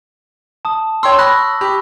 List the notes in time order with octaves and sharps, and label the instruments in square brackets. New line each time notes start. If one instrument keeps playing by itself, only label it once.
[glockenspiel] A5 D#6
[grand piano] C#5 G5 C6 [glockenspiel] C#6 E6
[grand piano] B5 [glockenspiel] D#6 F#6 A#6
[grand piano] G4 [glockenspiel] B5